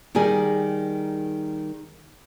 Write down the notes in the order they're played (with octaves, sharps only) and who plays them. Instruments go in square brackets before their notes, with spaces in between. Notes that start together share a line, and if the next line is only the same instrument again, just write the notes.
[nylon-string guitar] D#3 G3 D#4 G#4